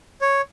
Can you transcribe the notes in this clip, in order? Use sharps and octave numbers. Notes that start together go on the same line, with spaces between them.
C#5